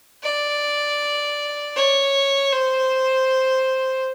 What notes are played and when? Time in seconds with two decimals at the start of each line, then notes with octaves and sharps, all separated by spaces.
0.23 D5
1.76 C#5
2.53 C5